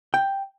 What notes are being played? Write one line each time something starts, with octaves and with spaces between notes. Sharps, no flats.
G5